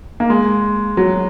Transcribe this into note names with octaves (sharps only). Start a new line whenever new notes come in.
A#3
G#3
F#3